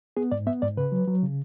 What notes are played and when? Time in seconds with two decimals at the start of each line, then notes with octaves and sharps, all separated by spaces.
0.17 B3 G#4
0.32 G#2 D5
0.47 B3 E5
0.62 G#2 D5
0.77 C#3 B4
0.92 F#3
1.07 F#3
1.23 C#3